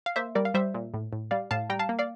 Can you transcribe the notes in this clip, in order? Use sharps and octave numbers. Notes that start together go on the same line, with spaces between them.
F5
A#3 C5 E5
G3 A#4 D5
F5
G3 C5 E5
A#2
A2
A2
G3 D5 F5
A2 F5 A5
G3 G5 A#5
F5 A5
A#3
D5 F5